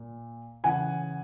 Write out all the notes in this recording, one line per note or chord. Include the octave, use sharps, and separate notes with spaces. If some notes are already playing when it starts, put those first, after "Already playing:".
Already playing: A#2
C#3 E3 F#5 G#5